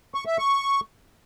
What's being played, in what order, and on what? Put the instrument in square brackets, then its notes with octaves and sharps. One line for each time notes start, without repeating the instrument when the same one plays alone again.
[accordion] C#6
E5
C#6